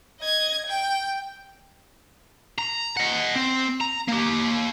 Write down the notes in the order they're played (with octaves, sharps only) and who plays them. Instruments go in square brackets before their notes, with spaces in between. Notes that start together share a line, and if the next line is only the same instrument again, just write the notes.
[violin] D#5 G#6
G5
[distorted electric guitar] A#5
D#5 F#5
C4
A#5
A#3 G4